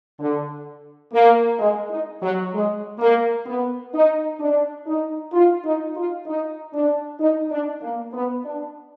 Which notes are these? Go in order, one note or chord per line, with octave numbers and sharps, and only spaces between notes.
D3
A#3
G#3
D#4
F#3
G#3
A#3
B3
D#4
D4
D#4
F4
D#4
F4
D#4
D4
D#4
D4
A#3
B3
D4